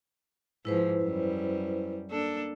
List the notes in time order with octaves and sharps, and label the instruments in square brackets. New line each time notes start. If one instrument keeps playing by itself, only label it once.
[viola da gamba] G#2 F3 [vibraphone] E4 B4 C5
[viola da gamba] F#2 G3
A#3 D4 A4